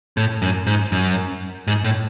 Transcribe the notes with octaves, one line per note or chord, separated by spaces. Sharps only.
A2
F#2
G#2
F#2
G#2
A2